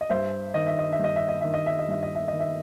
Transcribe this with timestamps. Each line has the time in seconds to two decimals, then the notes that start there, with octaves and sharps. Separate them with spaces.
0.01 D#5
0.09 G2 C5 E5
0.54 D#3 D#5
0.67 E5
0.79 D#5
0.92 E5
0.99 G2 D#5
1.16 E5
1.29 D#5
1.41 D#3 E5
1.54 D#5
1.66 E5
1.79 D#5
1.88 G2 E5
2.03 D#5
2.15 E5
2.28 D#3 D#5
2.40 E5